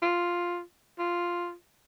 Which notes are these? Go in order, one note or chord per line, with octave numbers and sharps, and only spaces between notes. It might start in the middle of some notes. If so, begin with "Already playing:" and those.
F4
F4